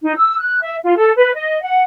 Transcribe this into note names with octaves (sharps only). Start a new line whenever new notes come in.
D#4
E6
F#6
E5
F4
A4
B4
D#5
F#5